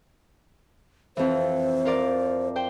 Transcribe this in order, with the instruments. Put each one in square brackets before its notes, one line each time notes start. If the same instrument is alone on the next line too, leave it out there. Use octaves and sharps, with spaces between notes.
[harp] F2 E3 [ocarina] C5
[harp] F4 A#4 D5
C5 G5